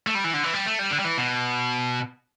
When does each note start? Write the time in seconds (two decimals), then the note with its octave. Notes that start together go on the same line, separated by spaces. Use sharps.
0.07 A3
0.15 G3
0.24 E3
0.34 D3
0.44 E3
0.53 G3
0.66 A3
0.79 G3
0.91 D3
0.99 G3
1.04 E3
1.18 B2